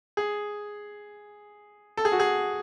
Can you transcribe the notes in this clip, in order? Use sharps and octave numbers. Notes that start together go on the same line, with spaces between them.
G#4
A4
G#4
F#4
G#4